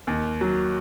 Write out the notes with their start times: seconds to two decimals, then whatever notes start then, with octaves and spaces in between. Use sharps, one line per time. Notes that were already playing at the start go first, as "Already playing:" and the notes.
0.07 D#2
0.41 F#3